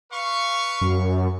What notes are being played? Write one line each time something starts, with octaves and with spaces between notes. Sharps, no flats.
B4 F5 C#6
F#2